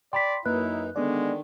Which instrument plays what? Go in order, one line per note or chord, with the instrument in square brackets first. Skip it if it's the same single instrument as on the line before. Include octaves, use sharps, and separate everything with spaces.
[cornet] D5 [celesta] G5 B5 B6 [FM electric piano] C6
[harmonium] F#2 D#4 [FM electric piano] A#3 B4 [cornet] E4 [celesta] F#6
[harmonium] D3 D#3 [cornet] G#3 [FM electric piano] B3 D4 D5